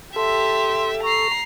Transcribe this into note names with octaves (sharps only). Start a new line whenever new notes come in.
G4 A4 E5 C6
A#5 C#6 C7